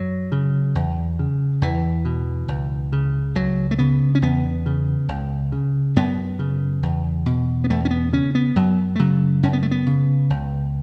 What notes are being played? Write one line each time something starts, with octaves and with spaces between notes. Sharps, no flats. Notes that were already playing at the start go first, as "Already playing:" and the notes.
Already playing: F#2 F#3
C#3
E2
C#3
E2 E3
B2
C#2
C#3
C#2 F#3
A3
C#3 B3
C#4
E2 B3
C#3
C#2
C#3
F#2 B3
C#3
E2
B2
B3
E2 A3
C#4
B3
C#3 C#4
B3
F#2 F#3
A3
C#3 F#3
F#2 C#4
B3
A3
B3
C#3
C#2